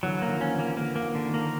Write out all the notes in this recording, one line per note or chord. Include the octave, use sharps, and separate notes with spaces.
D3 E3 F#3
A#3
D#3 F3
C#4
D3 E3
A#3
D3 E3 A#3
A#3
D#3
D3
D#3
A#3